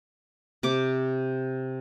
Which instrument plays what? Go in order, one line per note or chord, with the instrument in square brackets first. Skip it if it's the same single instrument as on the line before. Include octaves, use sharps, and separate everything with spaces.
[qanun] C3 D6